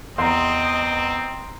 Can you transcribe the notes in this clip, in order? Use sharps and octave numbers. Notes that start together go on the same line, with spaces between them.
E2 C4 D#5 A#5 C6